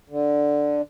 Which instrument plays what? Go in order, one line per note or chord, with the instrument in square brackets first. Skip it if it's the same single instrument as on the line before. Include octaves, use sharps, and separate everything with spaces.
[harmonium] D3